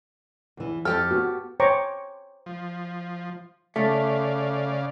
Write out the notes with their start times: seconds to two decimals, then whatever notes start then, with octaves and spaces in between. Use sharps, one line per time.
0.57 E2 E3
0.85 F2 G4 A4 F6
1.11 B3 F#4
1.60 C5 C#5 G5 A#5 C#6 D6
2.46 F3
3.76 C#3 A3 D5 F5